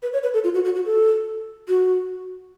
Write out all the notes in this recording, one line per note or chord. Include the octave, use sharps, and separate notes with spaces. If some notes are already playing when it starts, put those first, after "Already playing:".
B4
C#5
B4
A4
F4
F#4
F#4
F#4
A4
F#4